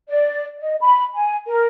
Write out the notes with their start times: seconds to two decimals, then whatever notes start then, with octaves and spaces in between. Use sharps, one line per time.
0.09 D5
0.60 D#5
0.81 B5
1.15 G#5
1.48 A#4